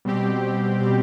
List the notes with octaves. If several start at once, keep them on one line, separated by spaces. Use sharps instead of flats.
B2 G3 C4 G4
B2 G3 C4 G4